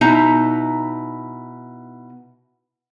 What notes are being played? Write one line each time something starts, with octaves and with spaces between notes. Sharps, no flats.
B2 D#4 E4 A#5